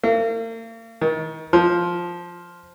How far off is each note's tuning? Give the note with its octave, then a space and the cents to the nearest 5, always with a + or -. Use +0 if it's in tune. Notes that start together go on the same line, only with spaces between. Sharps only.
A#3 -45
D#3 +30
F3 +0